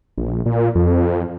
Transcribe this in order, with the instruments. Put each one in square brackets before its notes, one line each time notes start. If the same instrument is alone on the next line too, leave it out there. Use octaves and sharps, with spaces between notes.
[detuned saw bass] A#1
A#2
F2